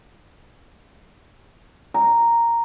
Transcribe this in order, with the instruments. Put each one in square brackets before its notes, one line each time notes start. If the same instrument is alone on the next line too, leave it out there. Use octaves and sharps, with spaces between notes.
[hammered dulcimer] A#5